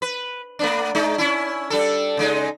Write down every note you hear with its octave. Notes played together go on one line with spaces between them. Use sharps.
B4
A3 B3 D4
G#3 D#4
C#4 E4
G3 D4 A4
C#3 G#3 D#4